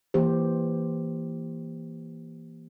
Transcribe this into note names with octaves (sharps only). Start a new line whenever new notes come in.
E3 A#3 G4 C5